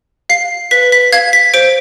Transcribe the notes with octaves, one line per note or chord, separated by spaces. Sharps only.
F5 C7
B4 B6
B6
F5 G#6
B6
C5 D7